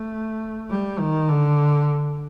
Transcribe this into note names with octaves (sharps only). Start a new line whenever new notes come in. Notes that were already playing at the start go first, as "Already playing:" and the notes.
Already playing: A3
G3
D#3
D3